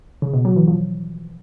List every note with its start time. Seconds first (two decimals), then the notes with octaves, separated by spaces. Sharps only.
0.22 C#3
0.34 B2
0.45 F#3
0.56 E3
0.68 F3